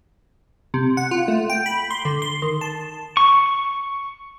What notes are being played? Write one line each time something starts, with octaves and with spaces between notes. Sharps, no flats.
C3
F#5
F4
A3
G5
B5
C6
D3
C6
D#3
A5
C#6